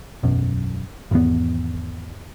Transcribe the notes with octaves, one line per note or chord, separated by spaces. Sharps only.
E1 B1 F#2
G#1 E2 B3